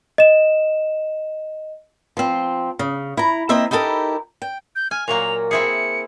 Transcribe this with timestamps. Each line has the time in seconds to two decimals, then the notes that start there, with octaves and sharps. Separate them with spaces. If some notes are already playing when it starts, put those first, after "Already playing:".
0.18 D#5 E7
2.17 F3 C4
2.79 C#3
3.17 E4 A#5
3.49 A#3 C4 D#5 E5 A#5
3.71 D#4 E4 G4 A4 A#4
4.42 G5
4.76 G6
4.91 G#5 F6
5.08 A#2 F#3 A#3 F7
5.51 C4 E4 G#4 C#7